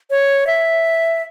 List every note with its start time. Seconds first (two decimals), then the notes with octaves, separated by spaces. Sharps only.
0.10 C#5
0.47 E5